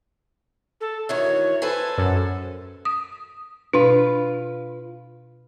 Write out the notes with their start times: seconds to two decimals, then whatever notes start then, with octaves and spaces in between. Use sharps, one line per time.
0.81 A4
1.09 D2 D#3 E3 C#5
1.62 A4 B4 C5 G#5
1.98 F#2
2.85 D#6
3.73 B2 D4 F4 B4